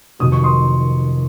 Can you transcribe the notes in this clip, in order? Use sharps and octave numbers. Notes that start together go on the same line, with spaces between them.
F1 F2 C3 D#3 F#3 D#6
C#6
C6 D#6